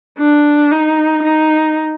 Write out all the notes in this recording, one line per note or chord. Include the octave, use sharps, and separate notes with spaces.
D4
D#4
D#4